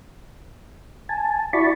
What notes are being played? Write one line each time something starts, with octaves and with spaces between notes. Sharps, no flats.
G#5 A5
E4 F#4 D5 A5 B5 C#6